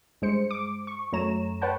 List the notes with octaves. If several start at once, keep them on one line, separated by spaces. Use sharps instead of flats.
G2 G#3 C5 C#7
D6
C#6
F#2 A3 C#5 A#5 E7
B4 C#5 F#5 G5 A5